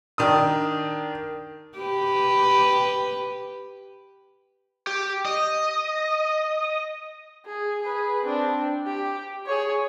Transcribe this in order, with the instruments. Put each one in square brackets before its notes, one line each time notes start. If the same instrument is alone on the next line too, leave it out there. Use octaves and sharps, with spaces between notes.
[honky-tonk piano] D#3 D4 D#6
[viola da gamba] G4 B4
[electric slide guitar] G4
D#5
[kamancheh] G#4
G#4 B4
C4 D4
G4
G#4 C#5